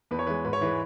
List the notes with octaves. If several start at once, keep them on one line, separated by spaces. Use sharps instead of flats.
E2 B4
C#5
E3 G#3 B4
G#2 B4
C#5
E3 G#3 B4